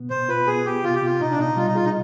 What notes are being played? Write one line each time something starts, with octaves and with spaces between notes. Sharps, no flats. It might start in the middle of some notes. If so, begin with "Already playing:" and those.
Already playing: B2 B3
B2 C5
F4 B4
B3 G#4
B3 G4
C3 F4
G4
C3 F4
B2 D#4
D4
B2 D#4
G3 F4
D#4
F4 G#4
D#4